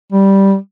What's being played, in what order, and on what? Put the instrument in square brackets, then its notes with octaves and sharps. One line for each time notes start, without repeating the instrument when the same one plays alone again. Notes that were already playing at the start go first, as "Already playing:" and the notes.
[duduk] G3